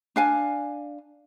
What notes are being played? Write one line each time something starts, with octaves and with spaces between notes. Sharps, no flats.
D4 F5 G#5